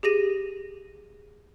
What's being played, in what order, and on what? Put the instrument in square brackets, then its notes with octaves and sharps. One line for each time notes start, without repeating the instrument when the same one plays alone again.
[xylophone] G4 G#4 A#6 D#7